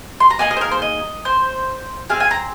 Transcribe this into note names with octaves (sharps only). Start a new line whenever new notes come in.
C6
A#5
A#3 D#4 G#4 G#5
D#5
C5
A#4
C5
D#5
C5
C4 G#4 F5
G#5
A#5